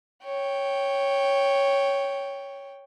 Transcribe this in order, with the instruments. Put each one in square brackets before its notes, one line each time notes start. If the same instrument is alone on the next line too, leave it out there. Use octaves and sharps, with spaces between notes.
[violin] C#5 G5